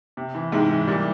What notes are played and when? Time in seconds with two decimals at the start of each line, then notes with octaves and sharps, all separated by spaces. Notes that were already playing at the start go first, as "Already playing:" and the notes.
0.17 C3
0.35 E3
0.52 G#2 C3 G#3
0.71 E3
0.88 A#2 G3